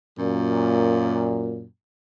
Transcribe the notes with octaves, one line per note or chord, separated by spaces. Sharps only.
F#2 A#2